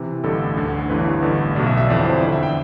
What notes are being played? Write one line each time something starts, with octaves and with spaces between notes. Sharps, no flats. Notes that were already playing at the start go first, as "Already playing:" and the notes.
Already playing: C3 E3
A1 G2 D3 A4
D2 D3
G1 G2 E3 B4
A1 G2 D3
B1 B2 D5
E5
E5
G1 F2 E3 D5
C5
E2 D3 D5
E5
G5